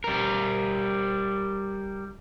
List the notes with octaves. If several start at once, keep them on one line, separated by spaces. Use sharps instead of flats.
G3 A#4